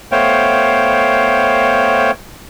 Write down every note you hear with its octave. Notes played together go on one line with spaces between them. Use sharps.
A3 B3 C5 C#5 F5 G5